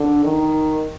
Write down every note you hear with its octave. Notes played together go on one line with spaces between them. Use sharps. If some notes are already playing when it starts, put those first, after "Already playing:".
Already playing: D3
D#3